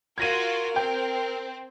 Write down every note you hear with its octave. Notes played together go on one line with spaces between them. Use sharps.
F4 F#4 A#4 G#6 A#6 D#7
C4 G5